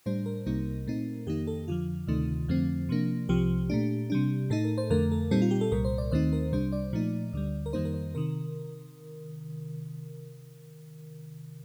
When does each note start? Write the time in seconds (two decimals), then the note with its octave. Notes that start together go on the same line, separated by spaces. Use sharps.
0.06 A2 G3 D4 C5
0.26 A#4
0.46 C2 C3 G3 A#3 D#4
0.87 A#2 A3 C4 D#4
1.27 F2 D#3 A#3 D#4 G4
1.47 A4
1.68 F2 D3 F3 F4
2.07 D2 C3 D#3 A3 D#4
2.48 F2 D3 F3 A3 C4
2.89 C3 F3 A#3 D4
3.29 C2 C3 F3 G4
3.70 A#2 A3 D4
4.10 C3 G3 D4
4.50 A2 A3 D#4 A4
4.64 A#4
4.78 C5
4.90 F2 D3 A3 A#4
5.11 A4
5.31 A#2 G3 C4 D#4 A4
5.42 F4
5.51 G4
5.61 A4
5.72 C2 A#2 G3 A#4
5.85 C5
5.98 D5
6.11 D#2 D#3 A3 C4 D#4 C5
6.33 A#4
6.52 C2 C3 G3 D4 C5
6.72 D5
6.93 A#2 F3 A3 D#4
7.33 D2 D3 G3
7.66 A#4
7.73 F2 D#3 G3 A#3 D#4 C5
7.85 A#4
7.94 C5
8.15 C3 D#3 A#4